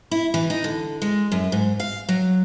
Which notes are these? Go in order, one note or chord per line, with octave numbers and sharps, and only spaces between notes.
E4
E3
D#4
D3
G#3
F#2
G#2
F5
F#3